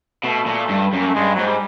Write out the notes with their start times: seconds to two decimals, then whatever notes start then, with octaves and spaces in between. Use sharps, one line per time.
0.24 B2 A3
0.46 A#2
0.69 G2
0.93 F#2
1.00 A#3
1.07 A3
1.15 G2 G#3
1.35 G#2 F#3
1.46 G3